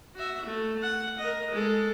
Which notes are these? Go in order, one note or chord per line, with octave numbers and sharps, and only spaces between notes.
F#4 E5
A3
F#5
A#4 D#5
G#3 A4